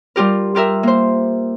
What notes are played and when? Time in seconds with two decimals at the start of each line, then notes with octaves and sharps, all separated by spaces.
0.16 G3 F4 G4 A#4
0.55 F4 G4 A#4 E5
0.83 A#3 C5